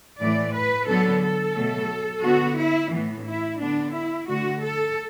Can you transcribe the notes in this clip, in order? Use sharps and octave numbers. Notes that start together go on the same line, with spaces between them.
A2 E3 A3 D5
B4
D3 F#3 B3 A4
A4
B2 F#3 A3
D3 B3 F#4
E4
A2 E3 B3
E4
D3 B3 D4
E4
D3 A3 F#4
A4